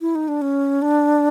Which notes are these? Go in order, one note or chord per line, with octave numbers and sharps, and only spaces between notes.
E4
D#4
D4
C#4
D4